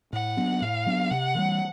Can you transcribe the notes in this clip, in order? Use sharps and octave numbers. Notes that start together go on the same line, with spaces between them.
A2 F#5
F#3 B3 D4
A2 F5
F#3 B3 D4
C3 F#5
E3 G3